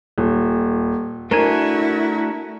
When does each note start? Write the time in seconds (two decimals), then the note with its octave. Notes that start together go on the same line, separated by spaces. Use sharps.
0.18 D#1
1.31 A3 D4 E4 F#4 A#4 G#5